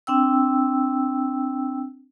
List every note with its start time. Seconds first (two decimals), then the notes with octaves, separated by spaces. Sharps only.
0.07 C4 D4 G5 E6